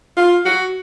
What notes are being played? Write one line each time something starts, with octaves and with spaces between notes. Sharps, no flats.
F4
F#4